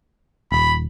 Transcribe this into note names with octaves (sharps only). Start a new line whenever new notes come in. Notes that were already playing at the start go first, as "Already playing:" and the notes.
D#1 B5